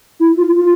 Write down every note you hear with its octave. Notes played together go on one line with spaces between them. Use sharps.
E4
F4
F4